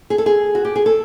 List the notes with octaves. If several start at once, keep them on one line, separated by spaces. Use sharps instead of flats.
G#4
A4
G#4
F#4
G4
G#4
A4